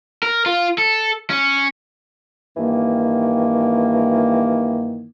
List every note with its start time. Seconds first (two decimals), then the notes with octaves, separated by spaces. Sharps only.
0.23 A#4
0.46 F4
0.78 A4
1.30 C#4
2.57 G2 D#3 E3 A#3